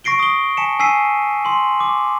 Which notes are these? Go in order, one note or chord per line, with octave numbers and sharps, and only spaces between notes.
C#6 A#6 C7 D7 G7
D#6 G7
G#5 A5 B6 C#7 E7
G#5 E6 B6 C7 D#7
C6 F#7
D6